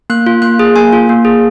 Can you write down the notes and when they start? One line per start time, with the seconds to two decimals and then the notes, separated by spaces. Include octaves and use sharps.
0.10 A#3 F#6
0.26 F4
0.42 A#3 F#6
0.59 G#4
0.76 A#3 G#5
0.93 F4
1.09 A#3
1.25 G#4